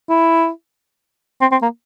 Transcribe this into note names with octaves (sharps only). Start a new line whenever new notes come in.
E4
C4
C4
A#3